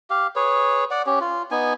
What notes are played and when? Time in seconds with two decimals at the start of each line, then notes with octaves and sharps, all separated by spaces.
0.10 G4 F5
0.36 G#4 B4 C#5
0.91 D5 F#5
1.06 C#4 G4
1.21 F4
1.51 B3 D#4 G#5